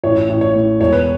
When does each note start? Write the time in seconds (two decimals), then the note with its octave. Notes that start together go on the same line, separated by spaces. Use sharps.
0.04 A1 C#5
0.29 A1
0.41 C#5
0.55 A2
0.80 E1 C#5
0.93 B4